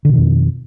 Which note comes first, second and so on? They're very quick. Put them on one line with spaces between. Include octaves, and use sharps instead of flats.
D3 B2 D#3 F2